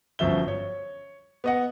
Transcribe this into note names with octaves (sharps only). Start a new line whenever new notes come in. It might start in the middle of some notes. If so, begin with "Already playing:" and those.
G1 F#2 F3 E5 G7
C#5
B3 D#5 F#5